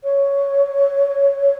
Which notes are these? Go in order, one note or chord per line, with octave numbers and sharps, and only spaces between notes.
C#5